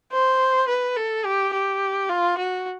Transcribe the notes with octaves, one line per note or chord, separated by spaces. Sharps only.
C5
B4
A4
G4
G4
F4
F#4